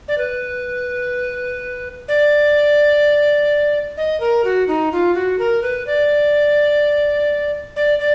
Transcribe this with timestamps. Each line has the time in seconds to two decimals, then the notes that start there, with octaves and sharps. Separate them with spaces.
0.08 D5
0.18 B4
2.08 D5
3.97 D#5
4.20 A#4
4.45 F#4
4.68 D#4
4.92 F4
5.15 F#4
5.39 A#4
5.62 B4
5.87 D5
7.76 D5
7.99 D5